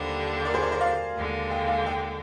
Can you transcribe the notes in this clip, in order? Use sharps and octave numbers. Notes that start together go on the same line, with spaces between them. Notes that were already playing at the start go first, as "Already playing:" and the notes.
Already playing: D#2 D3 G3 D4 C5 D#5
A#4 D5
G#4 C5
A#4 D5
C5 D#5
D5 F5
D#2 D3 G#3
D#5 G5
F5 G#5
D#5 G5